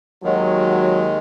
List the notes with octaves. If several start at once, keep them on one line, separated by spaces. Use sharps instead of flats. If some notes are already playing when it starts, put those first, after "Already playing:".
D#2 D#3 F#3 G#3